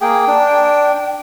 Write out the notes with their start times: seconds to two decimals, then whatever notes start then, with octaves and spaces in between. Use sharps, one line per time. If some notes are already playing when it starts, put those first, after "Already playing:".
0.01 A#3 G#4 G5
0.27 D4